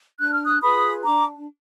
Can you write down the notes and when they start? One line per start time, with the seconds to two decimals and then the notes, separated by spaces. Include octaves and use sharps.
0.20 D4 F#6
0.32 F6
0.44 D#6 F#6
0.62 F4 G#4 B4 B5 D#6
1.04 D4 A#5 D6